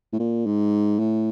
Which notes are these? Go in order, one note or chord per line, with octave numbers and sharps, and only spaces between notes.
A2
A#2
G#2
A2